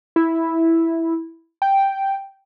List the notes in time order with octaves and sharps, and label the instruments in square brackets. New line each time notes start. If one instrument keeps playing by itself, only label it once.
[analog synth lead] E4
G5